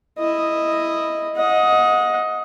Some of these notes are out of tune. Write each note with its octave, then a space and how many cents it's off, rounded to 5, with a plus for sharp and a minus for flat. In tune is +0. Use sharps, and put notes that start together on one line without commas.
E4 +0 D#5 +0
D#5 +15 F#5 -30